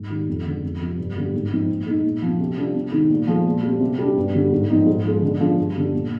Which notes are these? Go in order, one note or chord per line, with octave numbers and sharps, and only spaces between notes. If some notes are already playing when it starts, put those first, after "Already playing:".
Already playing: G#2
D#3 G3
F2
D3 G#3
F2
C3 F3
G2
D3 G3 A#3
G#2
F3 C4 D#4
A#2
G#3 D#4
A#2
F3 C4
C3
G3 D4 F4
C3
D#3 G#3 C4 D#4
A#2
F3 G#3
A#2
G3 C4
C3
G3 D4
G2
D3 G3
G#2
F3 C4 D#4
G#2
F3 G#3
D3
F3 G#3 D4 F4
G2
D3 G3
A#2